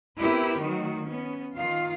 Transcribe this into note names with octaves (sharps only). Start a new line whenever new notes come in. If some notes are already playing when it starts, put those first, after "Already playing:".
B3 C4 E4 G4 A#4 B4
D#3 F#3 A3 F#4
B3 C#4
D#3 F4 F5